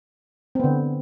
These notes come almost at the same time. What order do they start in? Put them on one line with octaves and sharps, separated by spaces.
C4 B3 D3